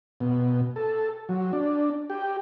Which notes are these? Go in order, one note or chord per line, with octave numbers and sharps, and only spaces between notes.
B2
A4
F#3
D4
G4